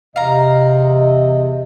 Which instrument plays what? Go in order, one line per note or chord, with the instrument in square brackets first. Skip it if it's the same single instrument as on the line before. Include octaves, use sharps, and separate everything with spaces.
[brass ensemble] E2 D#5 [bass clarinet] C3 [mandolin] F5 A#5